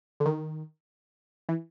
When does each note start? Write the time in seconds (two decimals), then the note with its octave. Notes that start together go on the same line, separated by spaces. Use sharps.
0.20 D3
0.26 D#3
1.49 E3